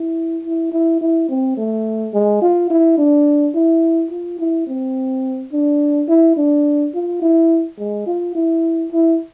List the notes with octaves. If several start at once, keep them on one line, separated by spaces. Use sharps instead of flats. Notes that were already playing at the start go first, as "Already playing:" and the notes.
Already playing: E4
E4
E4
E4
C4
A3
G#3
F4
E4
D4
E4
F4
E4
C4
D4
E4
D4
F4
E4
G#3
F4
E4
E4